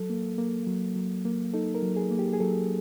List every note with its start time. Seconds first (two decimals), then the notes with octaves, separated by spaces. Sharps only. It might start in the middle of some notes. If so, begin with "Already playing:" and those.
Already playing: F#3 A4
0.10 A#3
0.38 A#3
0.67 F#3
0.95 F#3
1.25 A#3
1.54 D#4 A4
1.75 A#4
1.82 F#3
1.97 G#4
2.11 A#3
2.19 G4
2.33 G#4
2.40 F#3 A4